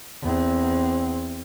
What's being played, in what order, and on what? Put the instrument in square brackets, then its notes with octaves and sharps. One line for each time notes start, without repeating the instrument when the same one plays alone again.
[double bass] E2 C4